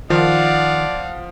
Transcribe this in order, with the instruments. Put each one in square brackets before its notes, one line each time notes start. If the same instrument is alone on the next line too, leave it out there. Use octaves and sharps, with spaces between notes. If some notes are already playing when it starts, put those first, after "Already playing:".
[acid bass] D#3 [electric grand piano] F3 [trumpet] D5 [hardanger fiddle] F5 F#5